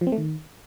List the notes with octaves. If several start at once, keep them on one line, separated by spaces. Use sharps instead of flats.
F3
C4
A3
D#3